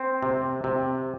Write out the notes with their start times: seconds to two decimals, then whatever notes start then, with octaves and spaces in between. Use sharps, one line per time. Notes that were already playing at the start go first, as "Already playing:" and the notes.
Already playing: C4
0.22 C3
0.64 C3